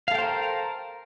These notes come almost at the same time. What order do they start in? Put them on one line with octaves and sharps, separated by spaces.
F5 A4 G5 C5 A#4